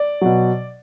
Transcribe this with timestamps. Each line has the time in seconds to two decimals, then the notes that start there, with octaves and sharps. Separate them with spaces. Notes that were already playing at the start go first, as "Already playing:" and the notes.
Already playing: D5
0.21 B2 F#3